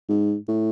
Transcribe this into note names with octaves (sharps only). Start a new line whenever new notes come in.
G#2
A2